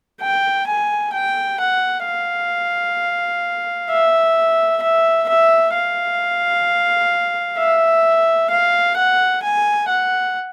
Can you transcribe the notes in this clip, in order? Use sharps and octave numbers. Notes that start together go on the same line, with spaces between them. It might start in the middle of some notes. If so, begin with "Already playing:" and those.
G5
G#5
G5
F#5
F5
E5
E5
E5
F5
E5
F5
F#5
G#5
F#5